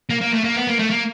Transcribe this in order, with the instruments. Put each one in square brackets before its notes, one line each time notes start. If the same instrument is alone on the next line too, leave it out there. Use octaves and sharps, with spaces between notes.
[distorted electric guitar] A#3
A#3
A3
A#3
B3
A#3
A3
A#3